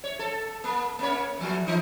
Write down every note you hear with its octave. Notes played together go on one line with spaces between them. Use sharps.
C#5
A4
A#3
A#3 C#4 C#5
E2 A2 F3
E3 D#4